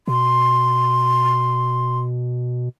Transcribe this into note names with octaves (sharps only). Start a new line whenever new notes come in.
B2 C6